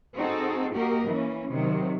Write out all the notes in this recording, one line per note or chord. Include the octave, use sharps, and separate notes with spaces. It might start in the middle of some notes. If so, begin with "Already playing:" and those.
C4 D#4 F#4 G#4 A4
A#3 F#4 G4 A#4 D#5
E3 A#3 C#4
C3 D#3 F#3